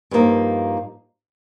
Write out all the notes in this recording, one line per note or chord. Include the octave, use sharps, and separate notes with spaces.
G2 F3 A#3 D#4